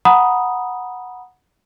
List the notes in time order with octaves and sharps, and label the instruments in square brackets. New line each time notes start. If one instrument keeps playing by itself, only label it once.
[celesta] F#5 A#5 B5 D#6